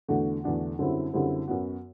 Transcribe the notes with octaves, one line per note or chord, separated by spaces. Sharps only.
E2 D3 A3 D4 F#4
E2 D3 A3 D4 F#4
F#2 D3 G3 C4 E4
F#2 D3 G3 C4 E4
F#2 F#3 B3 F#4